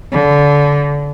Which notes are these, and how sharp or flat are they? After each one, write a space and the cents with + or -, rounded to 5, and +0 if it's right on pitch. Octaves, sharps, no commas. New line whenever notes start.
D3 -25